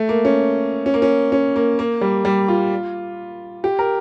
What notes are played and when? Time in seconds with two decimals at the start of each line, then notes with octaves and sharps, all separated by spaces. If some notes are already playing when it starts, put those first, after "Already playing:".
Already playing: A3
0.09 A#3
0.25 C#4
0.86 C#4
0.94 A#3
1.02 C#4
1.32 C#4
1.56 A#3
1.79 A#3
2.01 G3
2.25 G3
2.48 F4
3.64 G4
3.79 A#4